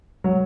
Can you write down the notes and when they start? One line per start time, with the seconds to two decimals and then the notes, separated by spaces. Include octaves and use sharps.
0.24 F#3